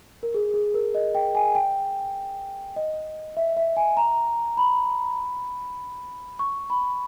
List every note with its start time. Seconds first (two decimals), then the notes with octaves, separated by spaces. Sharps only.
0.23 A#4
0.34 G#4
0.54 G#4
0.74 A#4
0.95 D#5
1.15 G5
1.35 G#5
1.55 G5
2.76 D#5
3.37 E5
3.57 E5
3.77 G#5
3.97 A#5
4.57 B5
6.39 C#6
6.70 B5